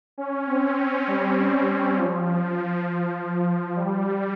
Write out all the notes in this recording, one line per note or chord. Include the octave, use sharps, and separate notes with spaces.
C#4
C4
C4
G3
G3
F3
G3